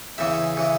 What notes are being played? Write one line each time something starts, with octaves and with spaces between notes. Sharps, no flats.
E2 C#3 E3 E5
C#3 E3